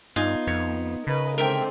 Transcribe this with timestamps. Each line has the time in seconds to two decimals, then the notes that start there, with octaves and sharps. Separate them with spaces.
0.16 G2 B3 D#4 F4 G#5
0.47 F2 C#5
1.07 C#3 A#4 B4 D#5
1.38 G#2 D3 C4 A#4 E5 G5